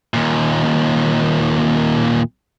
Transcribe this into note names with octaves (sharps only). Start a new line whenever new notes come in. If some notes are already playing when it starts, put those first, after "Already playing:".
D#2 A#2